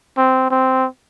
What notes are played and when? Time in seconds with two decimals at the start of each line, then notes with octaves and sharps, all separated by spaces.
0.17 C4
0.51 C4